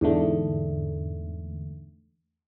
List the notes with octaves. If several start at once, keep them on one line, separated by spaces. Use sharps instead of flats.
E2 G#2 D3 A3